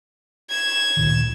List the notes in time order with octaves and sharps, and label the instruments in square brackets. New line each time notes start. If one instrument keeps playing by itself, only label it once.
[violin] G#6 E7
[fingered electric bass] D2 A#2 D#3